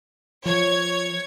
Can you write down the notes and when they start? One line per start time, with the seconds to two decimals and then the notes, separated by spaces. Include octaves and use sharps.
0.46 F3 C#5 G#6